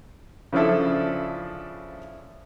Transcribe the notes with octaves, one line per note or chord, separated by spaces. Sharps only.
C#3 F3 D4 E4 A4